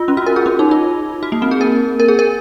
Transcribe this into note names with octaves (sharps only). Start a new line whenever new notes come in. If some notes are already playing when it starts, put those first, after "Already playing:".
Already playing: F4
C#4
F#4
A#4
G#4
C#4
D#4
F4
F#4
A#3
C4
G#4
A#4
A#4
G#4
A#4